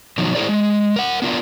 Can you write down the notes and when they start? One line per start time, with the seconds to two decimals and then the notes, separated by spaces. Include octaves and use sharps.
0.18 B2 D#3 F3 F#3
0.35 A2 E4 G#4 A#4 C5 D5
0.49 G#3
0.96 A#4 F#5
1.22 B3 D4 F4 A#4